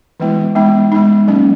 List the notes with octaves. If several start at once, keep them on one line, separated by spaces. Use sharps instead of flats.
E3 G#3 B3 E4
G#3 B3 D#4
G#3 B3 D#4
F#3 A#3 C#4